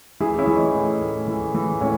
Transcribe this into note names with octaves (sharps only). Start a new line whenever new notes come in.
E3 E4 G#4
C#4 E4
E3
D#4
A2
A2
E3
E3
A2 C#4 E4